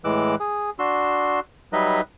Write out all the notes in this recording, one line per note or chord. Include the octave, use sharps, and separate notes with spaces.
A2 E3 G#3 D6 E6 F#6
G#4
D4 F#4 C6 E6
F#3 G3 D#4 B4 D#5 E5